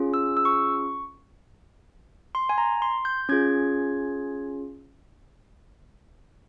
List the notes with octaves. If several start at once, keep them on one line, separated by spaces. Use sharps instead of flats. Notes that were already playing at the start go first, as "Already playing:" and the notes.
Already playing: C#4 F4 G#4
E6
E6
C#6
C6
G#5
A#5
C6
G6
C#4 F4 G#4 G#6